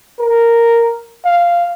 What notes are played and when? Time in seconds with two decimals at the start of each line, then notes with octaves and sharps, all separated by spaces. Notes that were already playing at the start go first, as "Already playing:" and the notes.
0.19 A#4
1.25 F5